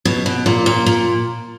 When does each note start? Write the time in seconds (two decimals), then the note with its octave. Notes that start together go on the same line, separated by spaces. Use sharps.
0.05 B2
0.26 B2
0.46 A#2
0.66 A#2
0.86 A#2